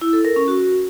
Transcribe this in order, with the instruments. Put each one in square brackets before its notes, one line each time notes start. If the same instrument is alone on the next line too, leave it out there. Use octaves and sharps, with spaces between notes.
[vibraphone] E4
A4
A#4
C#4
F#4